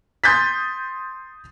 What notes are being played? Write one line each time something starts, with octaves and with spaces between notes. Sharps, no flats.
C6 D#6 G6 A6 B6